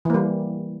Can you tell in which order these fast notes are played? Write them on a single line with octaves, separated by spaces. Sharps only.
E3 A#3 G3